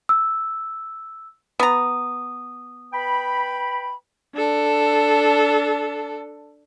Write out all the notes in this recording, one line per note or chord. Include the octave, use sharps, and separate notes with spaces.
E6
B3 A#5 D#6
B4 G5 B5
D4 A4